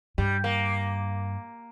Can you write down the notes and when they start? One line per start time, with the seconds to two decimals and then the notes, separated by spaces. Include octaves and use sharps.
0.18 G2 G3
0.44 A#3